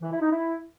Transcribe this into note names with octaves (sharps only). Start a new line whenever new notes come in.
E3
E4
D#4
E4